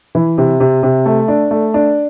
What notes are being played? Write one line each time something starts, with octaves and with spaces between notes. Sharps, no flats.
E3
C3
C3
C3
A3
D4
A3
D4